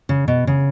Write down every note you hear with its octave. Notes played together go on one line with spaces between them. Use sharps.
C#3
B2
C#3